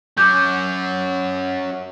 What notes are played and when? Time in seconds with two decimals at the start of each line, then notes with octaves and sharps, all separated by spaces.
0.18 F#3 C#4 D6 G6